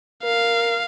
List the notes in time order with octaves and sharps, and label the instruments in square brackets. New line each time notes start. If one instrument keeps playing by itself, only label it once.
[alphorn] A#4 [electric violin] F5